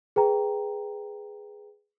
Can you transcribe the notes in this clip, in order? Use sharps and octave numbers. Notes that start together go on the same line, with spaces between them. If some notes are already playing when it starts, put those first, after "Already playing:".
G#4 B4 G5 A#5